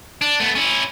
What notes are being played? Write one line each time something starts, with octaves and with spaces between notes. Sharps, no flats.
D4
A3 B3
C#4 E4